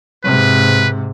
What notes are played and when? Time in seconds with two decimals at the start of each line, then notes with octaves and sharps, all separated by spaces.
0.24 G#2 C3 B4